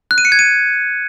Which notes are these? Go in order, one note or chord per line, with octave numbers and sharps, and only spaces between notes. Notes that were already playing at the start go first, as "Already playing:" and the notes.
F#6
D#7
C#7
G#6
D#7